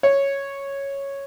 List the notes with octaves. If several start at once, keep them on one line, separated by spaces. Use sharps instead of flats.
C#5